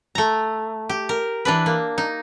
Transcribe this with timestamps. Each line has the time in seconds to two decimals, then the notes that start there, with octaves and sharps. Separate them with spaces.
0.15 A3 A#5
0.89 G4
1.09 A#4
1.45 E3 D4 B4
1.66 A#3
1.98 D#4